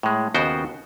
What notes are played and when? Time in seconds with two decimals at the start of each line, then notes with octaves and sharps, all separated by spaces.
0.03 A2 G#3
0.34 D#2 C#3 B3 F#4 C5 G5